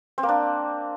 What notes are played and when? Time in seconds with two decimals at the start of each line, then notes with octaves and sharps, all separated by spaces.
0.18 C4
0.23 A#3
0.29 D4